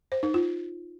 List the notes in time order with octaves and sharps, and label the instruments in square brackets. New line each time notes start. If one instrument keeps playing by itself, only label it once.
[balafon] C5
D#4
F4